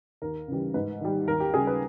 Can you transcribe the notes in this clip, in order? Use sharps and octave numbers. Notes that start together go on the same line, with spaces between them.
D#2 A#4
C#3 E3 G3
G#2 B4
D#3 G3
D#2 A#4
G4
C#3 G3 G#4
B4